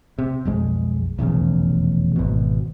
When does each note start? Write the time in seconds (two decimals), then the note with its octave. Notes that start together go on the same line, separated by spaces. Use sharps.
0.18 C3
0.45 B1 F2 G#3
1.18 F1 B1 E2 C#3
2.16 G#1 B2